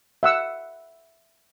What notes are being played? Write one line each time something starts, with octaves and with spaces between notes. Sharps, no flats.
E5 F#5 E6